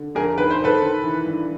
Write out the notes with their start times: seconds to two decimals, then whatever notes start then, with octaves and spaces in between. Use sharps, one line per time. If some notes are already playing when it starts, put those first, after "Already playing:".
Already playing: D3
0.15 F2 G#4 A#4
0.37 D#3 B4
0.51 C5
0.60 D#3 A4 B4
0.82 D#3
1.04 E3
1.26 G2